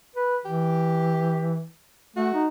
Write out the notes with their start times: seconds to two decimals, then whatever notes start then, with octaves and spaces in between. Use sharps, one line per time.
0.16 B4
0.45 E3 G4
2.16 A3 F#4
2.34 D#4